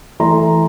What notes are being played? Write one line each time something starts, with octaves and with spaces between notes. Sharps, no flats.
E3 A3 A#5 C6